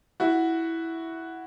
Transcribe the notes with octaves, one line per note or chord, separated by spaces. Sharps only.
E4 F#4